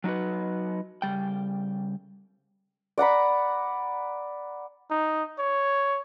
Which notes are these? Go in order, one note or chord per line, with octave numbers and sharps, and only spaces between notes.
F#3 D#4 F4 F#4 B4
C#3 G3 G5
D5 F#5 A#5 B5
D#4
C#5